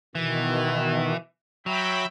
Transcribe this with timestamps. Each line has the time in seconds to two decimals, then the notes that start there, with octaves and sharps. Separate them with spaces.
0.15 B2 D#3 E3
1.66 F#3 E5 G5 B5